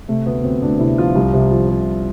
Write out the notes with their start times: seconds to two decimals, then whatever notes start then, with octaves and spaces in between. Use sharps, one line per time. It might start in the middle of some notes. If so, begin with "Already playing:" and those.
0.08 C3 A3
0.26 D2 B3
0.43 D2 C4
0.62 D2 D4
0.79 C3 E4
0.98 F3 F4
1.15 C2
1.33 C3
1.51 F3
1.69 C3